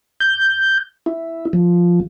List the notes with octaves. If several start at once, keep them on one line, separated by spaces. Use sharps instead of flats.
G6
E4
F3